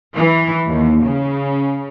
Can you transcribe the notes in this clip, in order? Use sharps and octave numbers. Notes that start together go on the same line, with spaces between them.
E3
D#2
C#3